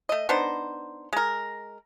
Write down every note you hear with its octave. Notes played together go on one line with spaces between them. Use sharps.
A3 D#5
B3 D4 D#4 C5
G#3 A#4